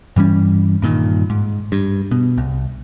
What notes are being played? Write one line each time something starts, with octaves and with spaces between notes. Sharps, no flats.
G2 E3 G3 C#4
G2 A#2 D#3
G#2
G2
B2
C2